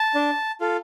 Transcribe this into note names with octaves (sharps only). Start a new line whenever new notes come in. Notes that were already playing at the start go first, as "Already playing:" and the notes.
Already playing: A5
D4
F4 A4